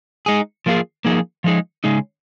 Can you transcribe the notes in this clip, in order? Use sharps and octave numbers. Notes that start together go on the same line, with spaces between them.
G#3 D#4 G#4
F3 A#3 F4 G#4
F3 A#3 D#4 G#4
F3 G#3 D#4 G#4
C#3 G#3 D#4 G#4